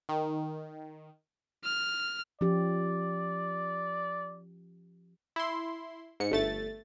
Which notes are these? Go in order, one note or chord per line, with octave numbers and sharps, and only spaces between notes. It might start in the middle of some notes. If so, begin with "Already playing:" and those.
D#3
F6
F3 C#4 G4 D5
E4 C6
G#2 C#7
G1 A3 A6